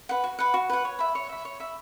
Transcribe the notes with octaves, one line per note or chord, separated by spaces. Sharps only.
B4 F#5
F#4
B4 F#5
F#4
B4 F#5
C#5
E5 B5
C#5
E5 B5
C#5
E5 B5